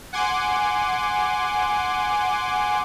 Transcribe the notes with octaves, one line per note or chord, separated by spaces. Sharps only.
F#5 G#5 C6 D6